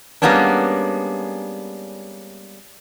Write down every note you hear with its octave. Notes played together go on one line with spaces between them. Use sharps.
G3 G#3 A#3 B3 C#4 D4